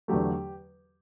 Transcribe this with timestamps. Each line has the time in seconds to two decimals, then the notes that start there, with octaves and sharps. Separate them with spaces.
0.08 E2 D3 F#3 A3 G4